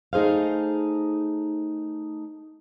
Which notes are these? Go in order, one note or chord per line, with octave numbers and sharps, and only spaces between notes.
A3 D#4 G#4 C5 F5